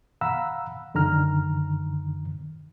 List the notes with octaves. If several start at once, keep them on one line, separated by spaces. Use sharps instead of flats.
F5 F#5 A#5 B5 E6
F#2 D3 D#3 A#5 F6